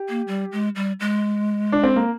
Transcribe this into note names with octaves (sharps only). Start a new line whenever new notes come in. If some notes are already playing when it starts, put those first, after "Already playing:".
Already playing: G4
A#3
G3
G#3
G3
G#3
D4
C4
A#3